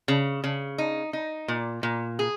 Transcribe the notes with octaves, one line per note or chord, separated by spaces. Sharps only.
C#3
C#3
D#4
D#4
A#2
A#2
G#4